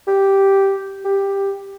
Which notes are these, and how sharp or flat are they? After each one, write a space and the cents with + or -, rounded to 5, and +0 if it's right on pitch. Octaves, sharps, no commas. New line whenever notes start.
G4 -5
G4 +10